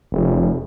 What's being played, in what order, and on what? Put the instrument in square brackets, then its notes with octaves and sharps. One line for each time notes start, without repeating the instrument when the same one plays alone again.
[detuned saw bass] F1